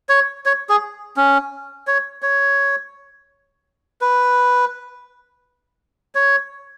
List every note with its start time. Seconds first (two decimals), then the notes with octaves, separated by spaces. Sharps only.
0.09 C#5
0.45 C#5
0.69 G#4
1.17 C#4
1.87 C#5
2.22 C#5
4.01 B4
6.15 C#5